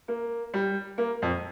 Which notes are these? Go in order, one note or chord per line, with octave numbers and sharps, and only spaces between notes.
A#3
G3
A#3
F2